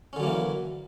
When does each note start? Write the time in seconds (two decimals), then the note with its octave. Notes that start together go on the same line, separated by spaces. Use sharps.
0.13 C#4
0.16 D3
0.20 F#3
0.23 A#3
0.26 E3